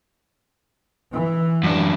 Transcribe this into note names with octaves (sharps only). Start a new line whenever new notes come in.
E3
F#2 D4